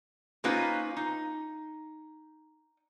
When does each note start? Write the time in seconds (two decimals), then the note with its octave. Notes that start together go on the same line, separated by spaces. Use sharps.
0.44 A#3 C#4 D#4 F4 B4 C5
0.97 D#4